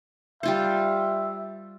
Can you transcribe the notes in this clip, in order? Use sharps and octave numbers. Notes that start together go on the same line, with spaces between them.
G3 F4 C5 E5